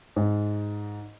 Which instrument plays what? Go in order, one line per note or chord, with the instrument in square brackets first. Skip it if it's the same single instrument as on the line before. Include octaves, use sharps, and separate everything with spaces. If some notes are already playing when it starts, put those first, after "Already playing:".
[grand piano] G#2